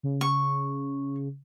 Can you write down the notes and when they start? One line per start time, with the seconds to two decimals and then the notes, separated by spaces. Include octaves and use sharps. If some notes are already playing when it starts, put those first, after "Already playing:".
0.03 C#3
0.21 C#6